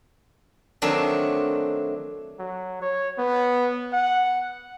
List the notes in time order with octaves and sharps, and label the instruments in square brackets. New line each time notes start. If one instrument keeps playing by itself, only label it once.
[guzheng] D#3 F#3 A3 C4 D4
[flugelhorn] F#3
C#5
B3
F#5